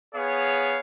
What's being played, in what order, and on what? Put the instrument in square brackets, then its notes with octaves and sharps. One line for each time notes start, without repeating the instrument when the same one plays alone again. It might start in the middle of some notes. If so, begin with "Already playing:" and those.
[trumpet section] B3 G#4 C#5 F5